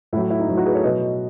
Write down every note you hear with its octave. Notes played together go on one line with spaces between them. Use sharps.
A2 F#3 E4
E4
D#4
A2 F#3
D#4 F#4
G#4 B4
A4 C#5
B2 F#3 B4 D#5